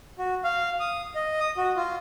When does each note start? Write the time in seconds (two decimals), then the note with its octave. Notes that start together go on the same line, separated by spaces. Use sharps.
0.18 F#4
0.44 F5
0.80 D#6
1.15 D#5
1.40 D#6
1.57 F#4
1.76 F4